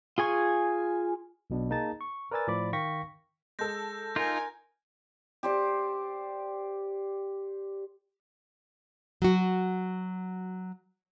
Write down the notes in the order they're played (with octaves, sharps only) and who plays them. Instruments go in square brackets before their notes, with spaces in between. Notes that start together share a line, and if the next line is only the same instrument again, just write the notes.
[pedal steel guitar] F4 G#4 G#5 C#6
[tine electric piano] B1 B2 D4
A#3 D#4 G#4 A5 A6
C#6
A#4 B4 D5 G#5 E6 A6
A2 F3 F4 D5 B5 D6
D#3 F5 G5 C#6 A#6 B6
[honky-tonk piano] G#3 A4 [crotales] G6 A#6
[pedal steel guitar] D#4 F4 [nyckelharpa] A#4 G#5
[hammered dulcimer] G4 C5 D5
[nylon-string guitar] F#3 F#4